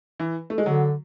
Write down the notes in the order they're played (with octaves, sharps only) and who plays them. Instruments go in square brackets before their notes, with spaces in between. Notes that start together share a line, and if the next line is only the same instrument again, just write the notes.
[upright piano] E3
A3
G#3
[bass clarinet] D3 [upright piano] F#3